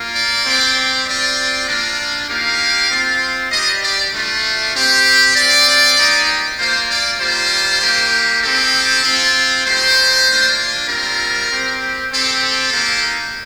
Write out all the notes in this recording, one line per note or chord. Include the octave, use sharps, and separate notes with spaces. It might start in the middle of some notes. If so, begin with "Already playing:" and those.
Already playing: A#3 F4
D5
C4 G4
C4 F4 D5
A#3 D4 F4
A#3 D#4 G4 F5
C4 F4
G3 D4 G4 D#5
D5
A3 D4 F4
C4 G4
C4 F4 D5
A#3 D#4 G4
A#3 F4 C5
D5
G3 A#3 F4 C5
A#3 D#4 G4
C4 D#4 G4 A4
C4 F4
A3 D#4 G4 C5
A#3 D4 F4
G3 C4 F4 A#4
C4 G4
C4 G4 A4
A4
A#3 D#4 G4